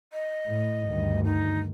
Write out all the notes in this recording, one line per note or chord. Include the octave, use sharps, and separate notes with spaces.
D#5
A2
D2 G2 D#3
D#4